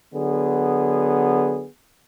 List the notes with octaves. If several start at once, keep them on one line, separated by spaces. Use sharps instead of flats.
D3 F#3 B3 G#4